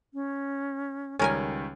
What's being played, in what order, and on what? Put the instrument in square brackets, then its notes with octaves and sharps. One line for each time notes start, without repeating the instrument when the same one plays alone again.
[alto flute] C#4
[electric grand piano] C#2 D#3 G3 [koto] C#4 A#4 G#5